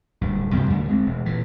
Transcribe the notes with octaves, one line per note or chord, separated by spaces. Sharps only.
D1 G2
G2 C3 G3 B3
D#2 D3 A3
G#3 C4
E1
A#2 E3